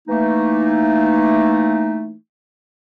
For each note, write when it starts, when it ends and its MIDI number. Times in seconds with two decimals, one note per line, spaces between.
0.08 2.15 52
0.08 2.15 57
0.08 2.15 58
0.08 2.15 63